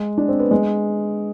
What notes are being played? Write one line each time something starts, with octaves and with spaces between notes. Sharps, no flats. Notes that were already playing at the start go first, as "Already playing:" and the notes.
Already playing: G#3
D4
C4
B3
G#3